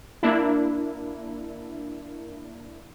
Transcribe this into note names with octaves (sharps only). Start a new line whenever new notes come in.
A#3 D4 E4